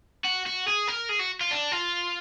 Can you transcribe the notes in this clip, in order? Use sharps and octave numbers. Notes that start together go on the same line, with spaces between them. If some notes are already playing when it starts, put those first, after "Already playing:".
F#4
F#4
G#4
A#4
G#4
F#4
F4
D4
F4